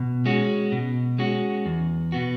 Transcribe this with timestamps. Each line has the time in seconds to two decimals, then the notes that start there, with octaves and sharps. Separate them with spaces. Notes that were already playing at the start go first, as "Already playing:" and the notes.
Already playing: B2
0.26 G#3 C#4 F#4
0.72 B2
1.18 G#3 C#4 F#4
1.66 E2
2.12 B2 B3 F#4